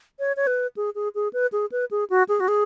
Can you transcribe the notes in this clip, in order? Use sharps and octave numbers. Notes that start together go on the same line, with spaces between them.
C#5
C#5
B4
G#4
G#4
G#4
B4
G#4
B4
G#4
F#4
G#4
F#4
G#4